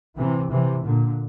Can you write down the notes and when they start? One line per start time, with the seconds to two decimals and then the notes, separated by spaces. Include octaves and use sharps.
0.16 C3 E3
0.51 C3 E3
0.84 A#2 D3